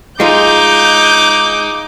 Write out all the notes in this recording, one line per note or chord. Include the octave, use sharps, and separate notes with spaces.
G#3 D#4 F4 D6 G6